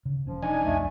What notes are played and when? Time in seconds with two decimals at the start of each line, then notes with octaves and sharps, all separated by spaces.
0.05 C#3
0.26 E1 F3 C#4
0.42 D4 D#4 G#5
0.66 B1 F2 A3